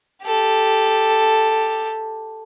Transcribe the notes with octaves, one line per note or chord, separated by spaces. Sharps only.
G4 A4